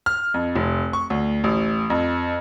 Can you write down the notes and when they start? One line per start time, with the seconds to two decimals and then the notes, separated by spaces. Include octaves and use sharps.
0.06 F6
0.34 F2
0.56 F1
0.93 C#6
1.10 D2
1.44 A1
1.90 F2